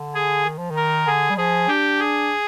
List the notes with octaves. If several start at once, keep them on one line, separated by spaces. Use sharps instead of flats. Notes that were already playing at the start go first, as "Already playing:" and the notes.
Already playing: D3
G#4
D#3
F3
D#3
A#4
D3 G#4
G3
F3 G#4
D4 G4
G#4